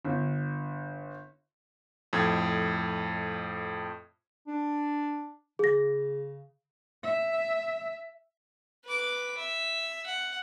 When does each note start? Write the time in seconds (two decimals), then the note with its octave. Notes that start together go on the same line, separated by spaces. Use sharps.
0.05 G1
2.13 F2 A2 G#6
4.47 D4
5.59 C#3 G#4 A#6
7.04 E5
8.84 B4 D6
9.37 E5
10.06 F#5